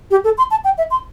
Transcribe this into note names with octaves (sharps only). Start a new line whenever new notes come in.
G4
A4
C6
A5
G5
E5
C6